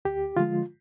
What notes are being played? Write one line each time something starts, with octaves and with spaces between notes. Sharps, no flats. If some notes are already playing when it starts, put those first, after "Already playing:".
D2 G4
D3 F3 G#3 F4